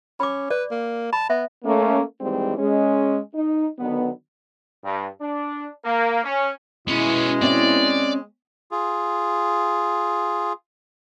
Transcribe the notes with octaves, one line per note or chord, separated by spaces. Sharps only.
C#4 B5 D6
B4 D5
A#3
A5 B5
B3 E5
A3 A#3 C#4
D#2 G#2 E3 G3 G#3 C4
G#3 C#4
D#4
D3 D#3 F#3 B3
G2
D4
A#3
C#4
B2 G#3 B3 C#4 E4
C4 C#4 D5 D#5
F4 G#4